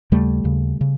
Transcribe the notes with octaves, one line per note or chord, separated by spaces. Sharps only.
D#2 C#3 G3 A3
D#2 C#3
C#3